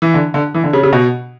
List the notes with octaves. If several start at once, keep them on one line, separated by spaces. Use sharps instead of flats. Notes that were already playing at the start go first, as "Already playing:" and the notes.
E3
D3
D3
E3
D3
C#3
C#3
B2